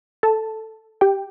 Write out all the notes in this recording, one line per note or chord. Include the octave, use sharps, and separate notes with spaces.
A4 A5
G4 G5